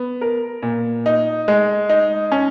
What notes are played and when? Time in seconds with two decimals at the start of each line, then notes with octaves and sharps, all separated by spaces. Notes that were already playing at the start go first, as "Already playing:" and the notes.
Already playing: B3
0.21 A#4
0.62 A#2
1.06 D#4
1.48 G#3
1.89 D#4
2.32 C#4